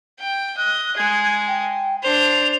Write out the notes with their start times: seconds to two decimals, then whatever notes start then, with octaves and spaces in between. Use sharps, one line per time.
0.20 G5
0.57 D#5 F#6
0.97 G#3 G#4 G#6
1.48 G5
2.03 D4 C5 F7